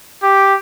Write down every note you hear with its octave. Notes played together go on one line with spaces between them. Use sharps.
G4